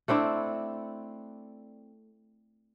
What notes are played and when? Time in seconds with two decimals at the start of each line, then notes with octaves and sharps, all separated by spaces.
0.08 A3 C4 D4 E4